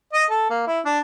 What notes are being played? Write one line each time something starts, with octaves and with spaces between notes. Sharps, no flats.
D#5
A4
A#3
E4
D4